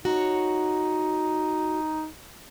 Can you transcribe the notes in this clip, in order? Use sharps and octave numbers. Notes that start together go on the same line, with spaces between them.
D#4 F#4 C#5